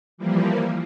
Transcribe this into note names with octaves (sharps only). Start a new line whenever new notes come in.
E3 F3 G3 A#3